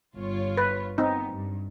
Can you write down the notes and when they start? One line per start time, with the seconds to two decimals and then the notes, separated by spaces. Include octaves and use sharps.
0.16 G1 F4 C#5
0.57 B4
0.98 B3 C4 D#4
1.33 G2